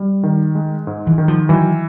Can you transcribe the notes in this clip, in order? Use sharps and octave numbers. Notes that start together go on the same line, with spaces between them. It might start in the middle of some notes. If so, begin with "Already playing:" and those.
Already playing: G3
D#3
G#3
G#2
E3
D#3
F3
E3 F#3